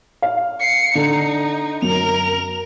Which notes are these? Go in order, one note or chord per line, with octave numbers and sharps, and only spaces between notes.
F5
C7 C#7
D3 D#4
F#2 A#4 F7